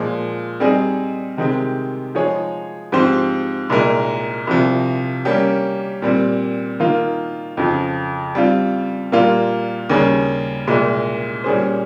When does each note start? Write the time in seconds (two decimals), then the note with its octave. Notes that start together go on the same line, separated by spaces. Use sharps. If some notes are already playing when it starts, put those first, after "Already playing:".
Already playing: A#2 F3 G#3
0.60 G3 C4 D#4 G#4 D#5
1.37 C3 D#3 G#3 C4 G4
2.15 F3 G#3 D#4 G#4 C#5
2.92 G#2 F3 C4 G4 C5
3.70 C2 A#2 G#3 D#4 A#4
4.47 C2 C3 F3
5.25 G3 A#3 C#4 G4
6.02 A#2 G3 C4
6.80 D#3 A#3 F4
7.57 F2 C#3 F3
8.35 G3 C4 F4
9.12 A#2 G3 A#3 F4
9.90 D#2 C#3 G3 C#4 G#4
10.67 C2 A#2 G#3
11.44 A#2 G3 C#4 G#4 C5